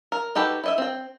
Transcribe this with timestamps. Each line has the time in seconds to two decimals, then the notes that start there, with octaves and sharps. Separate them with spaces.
0.12 A#4
0.35 D#4 F#4 G4 A4 B4
0.64 E4 D#5 E5
0.78 C4 G5